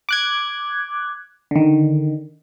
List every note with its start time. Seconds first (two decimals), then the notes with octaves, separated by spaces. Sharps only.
0.09 D6 F#6 G#6
1.51 D3 D#3